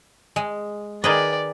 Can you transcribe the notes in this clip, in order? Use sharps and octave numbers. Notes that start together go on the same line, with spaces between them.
G#3
D#3 G#4 B4 D5 D#5 G5